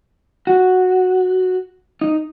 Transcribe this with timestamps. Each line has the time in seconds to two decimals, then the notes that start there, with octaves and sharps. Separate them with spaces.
0.47 F#4
2.01 D#4